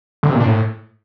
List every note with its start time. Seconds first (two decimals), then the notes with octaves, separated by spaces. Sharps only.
0.23 D3
0.29 C3
0.35 A#2
0.40 D4
0.46 A2